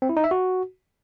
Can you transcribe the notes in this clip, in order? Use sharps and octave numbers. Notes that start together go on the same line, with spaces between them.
C4
E4
D#4
E5
F#4